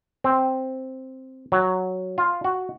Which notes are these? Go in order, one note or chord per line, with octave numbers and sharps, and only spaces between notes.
C4
F#3
F4
F#4